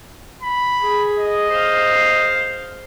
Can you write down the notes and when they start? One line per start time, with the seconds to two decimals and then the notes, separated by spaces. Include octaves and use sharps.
0.42 B5
0.82 G#4
1.19 D#5
1.51 C5 F5